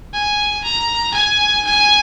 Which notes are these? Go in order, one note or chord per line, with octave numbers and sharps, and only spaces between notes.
G#5
A#5
G#5
G#5